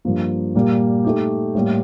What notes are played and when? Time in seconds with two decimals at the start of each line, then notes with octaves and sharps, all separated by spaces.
0.05 G2 F3 A#3
0.55 A#2 G3 A#3
1.04 A3 D#4 G4
1.55 A2 G3 A#3